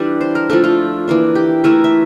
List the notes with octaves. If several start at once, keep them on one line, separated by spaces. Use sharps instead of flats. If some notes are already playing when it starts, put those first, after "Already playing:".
Already playing: E3 G3 D4
C5
A#4
F3 A3 D4 A4
F4
E3 A#3 D4
G4
E3 A3 E4 A#4
E5